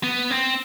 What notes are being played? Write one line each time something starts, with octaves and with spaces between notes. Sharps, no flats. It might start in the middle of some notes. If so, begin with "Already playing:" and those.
B3
C4